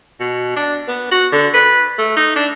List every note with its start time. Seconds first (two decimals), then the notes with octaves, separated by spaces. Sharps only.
0.20 B2
0.56 D4
0.88 B3
1.12 F#4
1.32 D3
1.54 B4
1.98 A3
2.17 D#4
2.36 D4